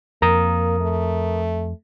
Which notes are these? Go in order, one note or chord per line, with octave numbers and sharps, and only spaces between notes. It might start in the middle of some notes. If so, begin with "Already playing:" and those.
F2 A#3 A#4 A#5 D#6
A3